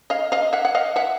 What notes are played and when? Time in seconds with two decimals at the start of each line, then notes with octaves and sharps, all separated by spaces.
0.10 D#5 F5
0.32 D#5 F5
0.53 E5 F#5
0.65 F#5
0.75 D#5 F5
0.96 E5 F#5